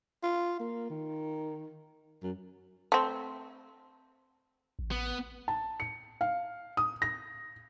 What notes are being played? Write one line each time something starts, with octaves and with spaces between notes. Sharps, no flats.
F4
A#3
D#3
F#2
A3 C4
A1
B3
A5
C#7
F5
D#6
A#6